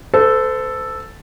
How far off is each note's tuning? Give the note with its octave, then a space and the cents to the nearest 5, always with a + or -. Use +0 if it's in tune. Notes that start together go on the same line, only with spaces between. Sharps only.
A4 +0 C5 -40